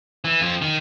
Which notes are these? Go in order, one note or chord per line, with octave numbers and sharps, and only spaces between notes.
E3
F2 F3
D#3